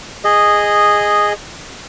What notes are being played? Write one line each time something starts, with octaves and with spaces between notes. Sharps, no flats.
G#4 D#5